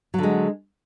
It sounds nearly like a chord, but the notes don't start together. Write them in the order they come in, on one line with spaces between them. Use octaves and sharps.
F#3 D3 G#3